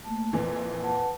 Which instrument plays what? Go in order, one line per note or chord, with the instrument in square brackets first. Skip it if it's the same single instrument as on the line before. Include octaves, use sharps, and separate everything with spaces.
[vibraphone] A3 A#3 A5
[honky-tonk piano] F2 A#2 E3 [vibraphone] B4
[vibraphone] B4 F#5 A5